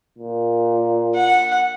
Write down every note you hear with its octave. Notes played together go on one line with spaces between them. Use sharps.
A#2
F#5